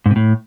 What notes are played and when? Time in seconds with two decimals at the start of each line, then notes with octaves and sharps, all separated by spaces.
0.06 G#2
0.11 C3
0.16 A2